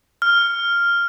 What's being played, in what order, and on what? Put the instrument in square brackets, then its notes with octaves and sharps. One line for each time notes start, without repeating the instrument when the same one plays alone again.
[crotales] F6